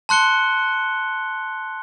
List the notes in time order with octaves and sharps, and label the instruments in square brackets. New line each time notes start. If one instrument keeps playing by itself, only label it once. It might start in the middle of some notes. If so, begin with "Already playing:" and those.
[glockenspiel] A5 C6 F#6 C#7 G7